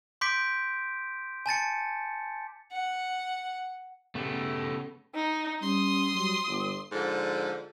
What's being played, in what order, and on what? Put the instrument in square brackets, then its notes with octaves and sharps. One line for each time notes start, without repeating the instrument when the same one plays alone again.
[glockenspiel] C6 D6 G6 B6 D7
G#5 A5 A6 C#7
[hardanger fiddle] F#5
[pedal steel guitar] C#3 B3 [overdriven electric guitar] A3 G4
[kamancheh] D#4
[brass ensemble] G3 C#4 [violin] C6 [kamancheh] D#6
[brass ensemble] F#3 G3
G1
[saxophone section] G#2 D3 F3